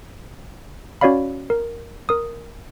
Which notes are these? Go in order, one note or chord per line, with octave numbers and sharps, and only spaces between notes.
C#4 F#4 C#5 D5 F5 B5
A#4
A#4 D#6